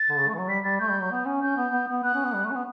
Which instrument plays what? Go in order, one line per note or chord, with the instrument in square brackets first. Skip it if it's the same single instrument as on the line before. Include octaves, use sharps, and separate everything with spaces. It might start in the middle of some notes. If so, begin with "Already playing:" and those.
Already playing: [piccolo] A6
[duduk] D3
C#3
A3
E3
F#3
[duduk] G3 [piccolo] B6
[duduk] G3 [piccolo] A6
[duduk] A3 [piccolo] G6
[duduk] G3
F#3
B3
C#4
[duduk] C#4 [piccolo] G6
[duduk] B3
B3
B3
[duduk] B3 [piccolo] F#6
[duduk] C#4
B3
G3
A3
C#4
B3